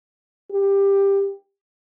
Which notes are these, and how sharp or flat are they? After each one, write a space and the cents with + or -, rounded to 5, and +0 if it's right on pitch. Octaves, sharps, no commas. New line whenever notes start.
G4 +15